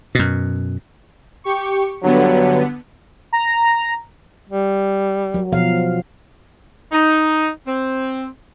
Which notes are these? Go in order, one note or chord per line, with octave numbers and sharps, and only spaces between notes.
F#2 B2
G4 C#6
G2 D3 F#3 B3
A#5
G3
F#3
B2 F3 F5
D#4
C4